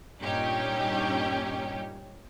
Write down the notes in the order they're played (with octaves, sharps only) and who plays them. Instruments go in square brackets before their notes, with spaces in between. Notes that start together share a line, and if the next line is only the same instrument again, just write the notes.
[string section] G2 A#2 C#4 D#4 G4